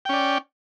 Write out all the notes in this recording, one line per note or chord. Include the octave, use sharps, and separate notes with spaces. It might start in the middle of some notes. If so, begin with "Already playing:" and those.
C#4 D5 G5